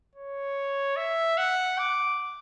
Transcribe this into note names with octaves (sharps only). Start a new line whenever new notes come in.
C#5
E5
F#5
D6